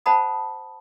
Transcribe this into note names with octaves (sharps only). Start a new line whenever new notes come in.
C5 F#5 A5 B5 D#6